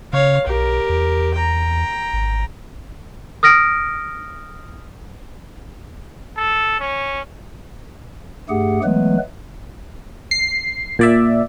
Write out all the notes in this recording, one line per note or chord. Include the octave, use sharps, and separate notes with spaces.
C#3 C#5 F5
B1 G4 A#4
E2
G5 A#5
G#1
D#6 F6 A#6 D7
A4
C#4
G2 A3 G4 G#4 F#5
E3 F#3 G#3 A3 B3 B4
C7
A#2 D5 E5